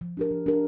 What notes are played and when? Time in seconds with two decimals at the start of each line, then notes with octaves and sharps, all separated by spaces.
0.01 F3
0.17 D4 G4 A#4
0.31 F3
0.46 D4 G4 A#4